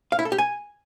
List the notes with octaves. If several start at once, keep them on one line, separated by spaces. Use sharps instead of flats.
F5
E4
A4
G4
G#5